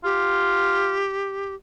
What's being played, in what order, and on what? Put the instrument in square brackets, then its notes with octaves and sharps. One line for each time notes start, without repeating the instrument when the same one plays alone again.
[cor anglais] F4 [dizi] G4